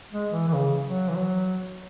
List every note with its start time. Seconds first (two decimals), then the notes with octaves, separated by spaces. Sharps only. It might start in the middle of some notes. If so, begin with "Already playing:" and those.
0.12 G#3
0.32 E3
0.48 E3
0.54 C#3
0.85 F#3
1.09 E3
1.17 F#3